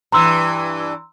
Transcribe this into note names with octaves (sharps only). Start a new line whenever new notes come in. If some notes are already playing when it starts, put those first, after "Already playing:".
G2 E3 A#5 C6 E6